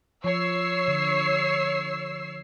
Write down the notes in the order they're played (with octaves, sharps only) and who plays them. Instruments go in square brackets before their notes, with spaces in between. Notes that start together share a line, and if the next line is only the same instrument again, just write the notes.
[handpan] F3 [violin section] C#5 E6 C7
[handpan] D3